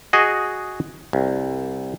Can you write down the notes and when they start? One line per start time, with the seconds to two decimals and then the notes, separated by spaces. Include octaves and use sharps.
0.13 F#4 G#4 D#5
1.13 C2